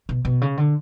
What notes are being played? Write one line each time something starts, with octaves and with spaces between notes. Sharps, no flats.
B2
B2
C#3
D3